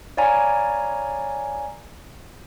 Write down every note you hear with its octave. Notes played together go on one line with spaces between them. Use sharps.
C#5 D5 F5 G#5 A#5 B5